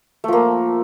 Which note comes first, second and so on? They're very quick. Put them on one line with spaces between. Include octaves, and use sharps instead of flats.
A3 F3 A#3